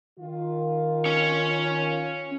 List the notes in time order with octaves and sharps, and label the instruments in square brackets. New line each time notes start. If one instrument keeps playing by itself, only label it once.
[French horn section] D#3 F4
[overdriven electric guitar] C#4 C#5